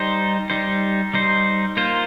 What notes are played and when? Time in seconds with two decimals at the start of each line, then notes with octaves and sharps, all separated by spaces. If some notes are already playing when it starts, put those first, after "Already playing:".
Already playing: G3 D#4 C5
0.50 G3 D#4 C5
1.14 G3 D#4 C5
1.77 A#3 F4 C5